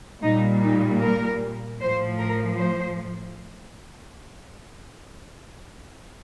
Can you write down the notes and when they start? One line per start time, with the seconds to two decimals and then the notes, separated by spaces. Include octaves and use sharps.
0.23 A#2 G3 D#4
0.62 D#4
1.02 A#4
1.80 A2 F3 C5
2.20 A#4
2.59 C5